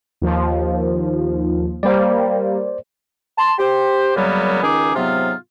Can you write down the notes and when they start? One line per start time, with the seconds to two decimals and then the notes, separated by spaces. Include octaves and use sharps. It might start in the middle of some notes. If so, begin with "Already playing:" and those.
0.21 D#2 F3
1.83 G3 A#3 C5 D5
3.38 A5 C6
3.59 G4 C5
4.16 F#2 C#3 F#3 G3 A#3 B3
4.62 C#2 D#3 C#4 D#4 G#4 D6
4.96 G#2 C3 F#3 B3 F4